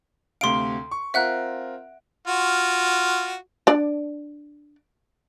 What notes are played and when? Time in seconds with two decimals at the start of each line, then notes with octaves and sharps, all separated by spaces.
0.41 D2 C3 F5 C6 D7
0.91 C#6
1.14 C4 F4 A#4 E5 F#5 F#6
2.27 F4 F#4
3.67 D4 D5